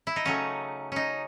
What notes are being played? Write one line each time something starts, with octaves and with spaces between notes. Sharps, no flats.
E4
D#4
C#3 F#3 A3 C#4
C#4 D#4